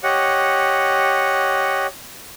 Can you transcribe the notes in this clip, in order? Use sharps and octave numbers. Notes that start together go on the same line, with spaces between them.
G4 C#5 D#5 F#5